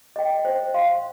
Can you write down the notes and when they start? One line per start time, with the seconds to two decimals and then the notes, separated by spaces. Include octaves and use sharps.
0.16 D#5 G5
0.45 C5
0.74 F5 C6